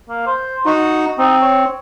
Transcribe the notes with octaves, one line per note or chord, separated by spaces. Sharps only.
A#3
C5
D#4 F#4
C4 D#4
C#5